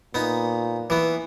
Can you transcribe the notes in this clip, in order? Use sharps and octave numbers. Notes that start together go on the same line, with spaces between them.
A#2 B3 D#4
E3 B3